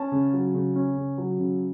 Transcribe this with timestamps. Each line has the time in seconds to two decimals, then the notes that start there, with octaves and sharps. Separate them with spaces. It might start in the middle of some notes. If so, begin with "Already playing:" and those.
Already playing: C#4 A5
0.12 C#3
0.33 F#3
0.54 C#3
0.76 C#4
0.96 C#3
1.18 F#3
1.40 C#3